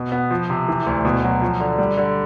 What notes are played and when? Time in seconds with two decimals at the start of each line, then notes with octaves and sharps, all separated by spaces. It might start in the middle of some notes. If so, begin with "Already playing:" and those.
Already playing: B2
0.12 B3
0.31 F3
0.50 C3
0.68 E3
0.86 D2
1.05 B2
1.24 F#3
1.42 F3
1.60 D3
1.78 G3
1.97 D3